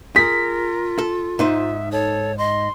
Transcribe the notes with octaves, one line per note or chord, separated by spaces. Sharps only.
F4 G#4 A#4 B6
A4
G#2 D#4 C5 E5
A4 C#5
D#5 C6